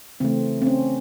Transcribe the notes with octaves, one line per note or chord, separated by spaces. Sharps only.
C#3 E3 A3 C4
C4
C#4